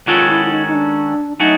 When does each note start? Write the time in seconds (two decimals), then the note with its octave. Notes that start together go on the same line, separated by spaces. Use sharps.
0.07 D#3 G#3 C#4 F4 F#4 A4
0.29 E4
0.46 E4
0.51 D#4
0.67 D#4
0.74 D4
1.40 F#3 A3 C#4 D#4 F#4